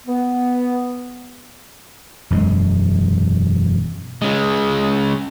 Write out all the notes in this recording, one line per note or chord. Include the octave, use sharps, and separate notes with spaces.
B3
E1 F#2 G#3
C#3 G#3